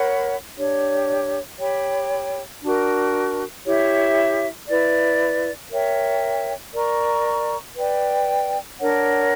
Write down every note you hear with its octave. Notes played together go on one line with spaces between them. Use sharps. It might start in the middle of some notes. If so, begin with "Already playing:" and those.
Already playing: A#4 C#5 F#5 B5
D4 G4 C#5
G4 C#5 G5 B5
D4 F#4 A#4
E4 G4 C#5 E5
E4 B4 D5
A#4 C#5 E5 G5
A#4 D5 A#5 C#6
B4 D5 G5
D4 A#4 C#5 F#5